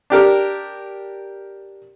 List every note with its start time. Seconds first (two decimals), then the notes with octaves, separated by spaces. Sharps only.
0.10 D4 G4 A#4